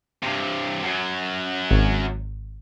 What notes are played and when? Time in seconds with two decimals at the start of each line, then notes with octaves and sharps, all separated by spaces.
0.23 G2 C3
0.83 F#2 F#3
1.71 G#1